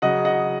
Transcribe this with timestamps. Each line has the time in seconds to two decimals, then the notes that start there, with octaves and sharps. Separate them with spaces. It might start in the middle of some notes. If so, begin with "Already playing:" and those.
0.02 C#3 F#3 D#5 F#5
0.25 D#5 F#5